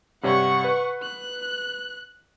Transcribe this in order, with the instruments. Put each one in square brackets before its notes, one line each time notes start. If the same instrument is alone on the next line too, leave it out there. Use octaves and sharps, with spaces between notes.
[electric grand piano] G2 C3 C#5 [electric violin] F#5 C#6
[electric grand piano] B4
[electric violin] F#6